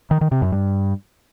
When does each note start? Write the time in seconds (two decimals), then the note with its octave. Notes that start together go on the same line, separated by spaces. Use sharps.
0.11 D#3
0.21 D#3
0.32 C3
0.42 F#2
0.52 G2